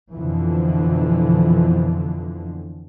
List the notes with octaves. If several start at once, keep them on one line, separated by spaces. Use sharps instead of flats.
F2 B2 D3 E3 F3